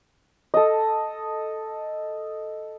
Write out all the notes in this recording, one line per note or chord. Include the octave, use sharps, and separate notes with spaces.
A4 D#5